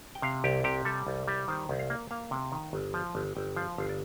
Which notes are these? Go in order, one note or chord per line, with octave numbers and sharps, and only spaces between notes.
G5
C3 F5
C2 G4
C3 G4
G3 A4
C2
G3
D#3 C5
C2
F5
A#3
A#3 F5
C3
D#3
G1
F3
G1
G1 G5
F3 F5
G1 F5
D5